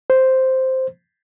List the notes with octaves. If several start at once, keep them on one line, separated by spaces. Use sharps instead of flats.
C5